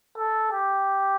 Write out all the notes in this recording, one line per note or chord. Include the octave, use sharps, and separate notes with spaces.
A4
G4